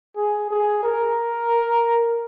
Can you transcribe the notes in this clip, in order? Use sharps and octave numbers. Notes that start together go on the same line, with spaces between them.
G#4
G#4
A#4